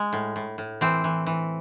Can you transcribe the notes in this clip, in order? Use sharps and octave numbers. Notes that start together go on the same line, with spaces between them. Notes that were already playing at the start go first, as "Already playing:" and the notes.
Already playing: G#3
A2
A2
A2
E3 C4
E3
E3